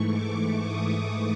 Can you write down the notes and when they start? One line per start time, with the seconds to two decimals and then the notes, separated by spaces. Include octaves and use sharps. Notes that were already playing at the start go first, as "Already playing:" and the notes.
Already playing: G#2 E3 A3 C#6
0.08 D6
0.63 D#6